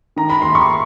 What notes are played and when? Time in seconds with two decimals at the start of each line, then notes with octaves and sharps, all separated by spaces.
0.16 D#3 A#5
0.30 B5
0.42 D#2 C6
0.55 C#6